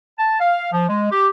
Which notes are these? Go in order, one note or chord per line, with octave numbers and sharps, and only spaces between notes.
A5
F5
F3
G#3
G4